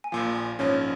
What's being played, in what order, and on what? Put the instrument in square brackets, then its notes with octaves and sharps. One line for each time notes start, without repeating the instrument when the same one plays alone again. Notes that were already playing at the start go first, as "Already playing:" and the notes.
[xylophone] G#5
[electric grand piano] A#1 A#2 F3 [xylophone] F5
[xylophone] G#5
[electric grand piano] A#1 G#2 F3 C#4 [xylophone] C#5